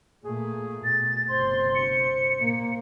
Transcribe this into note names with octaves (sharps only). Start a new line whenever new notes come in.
A#2 A3 G#4
B2 A6
G1 C3 C5 C6
C#7
A#2 A#3